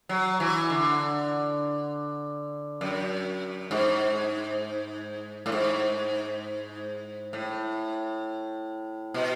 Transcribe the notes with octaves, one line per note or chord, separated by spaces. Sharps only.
F#3
E3
D3
F#2
G#2
A2
G#2
A2
B2